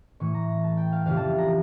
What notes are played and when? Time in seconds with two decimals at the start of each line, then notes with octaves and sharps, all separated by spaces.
0.20 A2 E3 A3 C#6
0.34 A#5
0.49 A#5
0.64 A5
0.77 G5
0.92 F5
1.06 F2 C#3 E3 G3 F5
1.17 A5
1.38 A#5